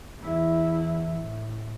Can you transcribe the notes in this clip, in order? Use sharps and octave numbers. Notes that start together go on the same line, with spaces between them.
E2 E4
A2